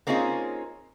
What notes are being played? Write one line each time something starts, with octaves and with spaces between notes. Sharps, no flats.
A#3 C4 C#4 D#4 F4 G#4